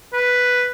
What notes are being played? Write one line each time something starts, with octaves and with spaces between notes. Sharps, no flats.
B4